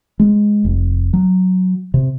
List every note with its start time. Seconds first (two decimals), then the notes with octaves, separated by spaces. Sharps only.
0.20 G#3
0.65 F1
1.13 F#3
1.94 C3